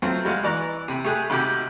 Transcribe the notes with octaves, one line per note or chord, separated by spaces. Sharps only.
F#3 A3 C4 F4
G3 G#3 F#4 F5
E3 D5 A#5 C#6 F#6
C3 B5
A3 G4 G#4 G#5 F#6
G#1 C3 F#4 G5 B5 D6